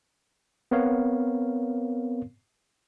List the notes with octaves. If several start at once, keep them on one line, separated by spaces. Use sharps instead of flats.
B3 C4 A#4 C#5 F5